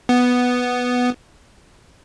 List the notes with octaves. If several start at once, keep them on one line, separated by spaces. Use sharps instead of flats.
B3